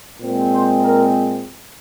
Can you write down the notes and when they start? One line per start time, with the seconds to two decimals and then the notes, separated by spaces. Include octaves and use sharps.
0.21 A#2 G#3 C4
0.51 C5
0.81 A#4